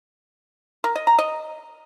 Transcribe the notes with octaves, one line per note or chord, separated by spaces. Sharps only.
A#4
D#5
A#5
D#5